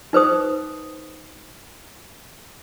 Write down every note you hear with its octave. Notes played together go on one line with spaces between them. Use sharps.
D#4 B4 C5 D#6